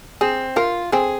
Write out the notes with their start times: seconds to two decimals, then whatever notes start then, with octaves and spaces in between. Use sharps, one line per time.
0.21 C4 G#4
0.56 F4 A#4
0.92 C4 G#4